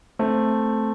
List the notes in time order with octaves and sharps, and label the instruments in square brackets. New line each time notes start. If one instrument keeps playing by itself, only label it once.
[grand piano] A3 C4